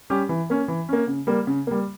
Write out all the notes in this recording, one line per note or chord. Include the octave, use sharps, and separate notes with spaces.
G3 C#4 G4
E3
A#3 C#4
E3
A#3 C#4
C#3
G3 A#3
C#3
G3 A#3